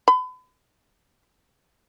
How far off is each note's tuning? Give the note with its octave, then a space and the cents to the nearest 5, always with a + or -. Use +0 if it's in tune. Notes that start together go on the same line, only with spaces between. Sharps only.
B5 +40